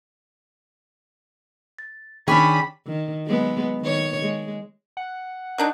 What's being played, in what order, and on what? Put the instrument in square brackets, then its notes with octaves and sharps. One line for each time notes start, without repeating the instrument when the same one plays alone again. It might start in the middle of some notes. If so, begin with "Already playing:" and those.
[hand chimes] A6
[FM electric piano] D#3 [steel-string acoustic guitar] C#4 D4 G#4 [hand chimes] G5 C#6 D6 [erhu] B5
[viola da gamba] D#3
F#3 G#3 B3
D#3 C#5
G#3
[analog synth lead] F#5
[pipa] F#3 D4 D#4